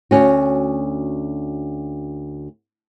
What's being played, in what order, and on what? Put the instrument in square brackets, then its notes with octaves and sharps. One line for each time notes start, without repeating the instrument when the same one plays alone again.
[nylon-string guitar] D2 C#4 F#4